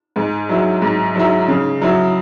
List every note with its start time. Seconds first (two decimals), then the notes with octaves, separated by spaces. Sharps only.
0.16 G#2
0.49 F#3 E4
0.82 G#2
1.15 F#3 E4
1.48 C#3
1.82 F#3 E4